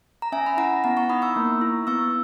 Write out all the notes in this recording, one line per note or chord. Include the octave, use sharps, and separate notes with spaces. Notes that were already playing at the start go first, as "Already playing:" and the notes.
A#5
C#4 E5 G#5
B5
E4 F#5 A#5
B3 F#5 A#5
A#5 C#6
D#4 B5 D#6
C#6 E6
A#3
E4
B3 C#6 E6